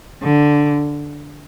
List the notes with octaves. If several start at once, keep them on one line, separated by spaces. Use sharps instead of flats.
D3